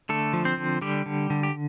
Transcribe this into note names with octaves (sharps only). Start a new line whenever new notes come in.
D3 A3 A4
F3
C4 C5
D3
D3 G3 G4
D3
D3
G4